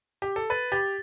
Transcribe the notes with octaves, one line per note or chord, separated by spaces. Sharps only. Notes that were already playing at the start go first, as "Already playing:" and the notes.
G4
A4
B4 A6
G4 A6